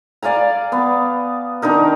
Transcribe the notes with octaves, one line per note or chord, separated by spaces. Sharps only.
D5 F5 G#5 A#5
B3
D#3 D4 D#4 A#4